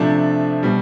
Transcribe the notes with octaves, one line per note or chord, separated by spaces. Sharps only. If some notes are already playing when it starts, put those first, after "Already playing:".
Already playing: C3 F3 A3 D4
B2 G3